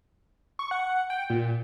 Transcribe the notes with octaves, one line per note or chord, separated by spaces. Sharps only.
C#6
F#5
G5
A#2